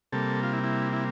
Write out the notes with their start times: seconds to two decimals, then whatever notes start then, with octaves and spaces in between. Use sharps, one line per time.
0.12 C3 G3 A#3 A4
0.43 F4
0.53 E4
0.63 E4
0.93 E4